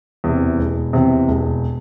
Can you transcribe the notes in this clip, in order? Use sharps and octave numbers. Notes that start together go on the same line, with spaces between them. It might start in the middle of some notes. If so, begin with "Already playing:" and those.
E2 C3
E1
E2 C3
E1